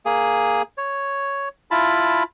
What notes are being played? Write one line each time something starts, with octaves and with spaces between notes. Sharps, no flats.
A#3 G#4
C#5
E4 F4 A5 B5